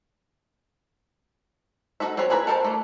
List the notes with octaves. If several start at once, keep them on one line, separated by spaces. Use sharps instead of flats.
D#4 F#4 A4 E5
C4 F#4 G#4 B4 C#5
E4 G#4 B4 C#5 A#5
A4 A#4 C5 D#5 A5
A3 A#3